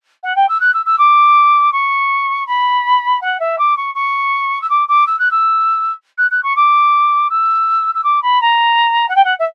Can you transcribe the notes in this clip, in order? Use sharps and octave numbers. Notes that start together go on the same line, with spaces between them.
F#5
G5
E6
F#6
E6
E6
D6
C#6
B5
F#5
E5
D6
C#6
C#6
E6
D6
D6
E6
F#6
E6
F#6
F#6
C#6
D6
E6
E6
D6
B5
A#5
F#5
G5
F#5
E5